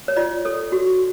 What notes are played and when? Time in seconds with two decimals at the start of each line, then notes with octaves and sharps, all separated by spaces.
0.08 C#5
0.17 F4 D5
0.45 A4 C#5
0.72 F#4